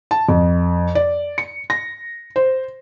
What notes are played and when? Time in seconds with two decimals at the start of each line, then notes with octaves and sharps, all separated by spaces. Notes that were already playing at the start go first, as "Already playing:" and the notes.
0.11 A5
0.29 F2
0.95 D5
1.38 C#7
1.70 A#6
2.36 C5